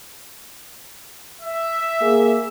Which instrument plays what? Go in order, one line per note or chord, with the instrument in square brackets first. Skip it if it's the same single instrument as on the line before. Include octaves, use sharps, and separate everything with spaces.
[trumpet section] E5
[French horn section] A#3 G#4